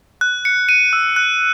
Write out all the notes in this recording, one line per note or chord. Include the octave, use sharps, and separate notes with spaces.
F#6
C#7
D#7
E6
F#6